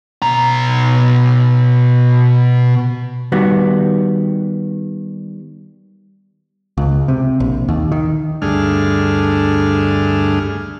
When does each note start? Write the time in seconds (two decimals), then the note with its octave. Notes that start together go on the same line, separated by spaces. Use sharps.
0.22 B2 A#5
3.32 D#3 G3 B3 F#4
6.77 C#2
7.08 C3
7.40 A#1
7.68 D#2
7.92 D#3
8.42 D2 G2 A3 D4 G#4 F6